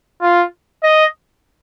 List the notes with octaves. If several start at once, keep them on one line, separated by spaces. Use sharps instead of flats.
F4
D#5